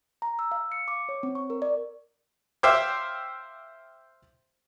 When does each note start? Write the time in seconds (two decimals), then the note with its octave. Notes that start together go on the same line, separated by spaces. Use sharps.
0.22 A#5
0.39 E6
0.52 F5
0.72 C#7
0.88 D6
1.09 C#5
1.23 C4
1.35 C#6
1.50 A#4
1.62 D5
2.63 C5 E5 F5 G5 D6